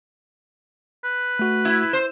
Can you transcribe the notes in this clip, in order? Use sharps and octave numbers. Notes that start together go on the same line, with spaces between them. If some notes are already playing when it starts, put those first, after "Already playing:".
B4
A3 F#4
E4
C5